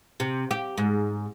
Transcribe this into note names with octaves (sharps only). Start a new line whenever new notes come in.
C3
G4
G#2